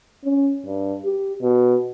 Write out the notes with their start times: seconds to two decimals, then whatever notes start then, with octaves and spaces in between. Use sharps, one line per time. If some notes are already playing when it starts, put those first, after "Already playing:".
0.24 C#4
0.66 G2
1.05 G4
1.42 B2